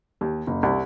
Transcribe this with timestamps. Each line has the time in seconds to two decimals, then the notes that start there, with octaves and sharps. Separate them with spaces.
0.21 D#2
0.47 F#1
0.63 C2